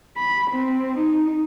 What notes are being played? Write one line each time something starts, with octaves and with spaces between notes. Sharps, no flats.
B5
C4
D#4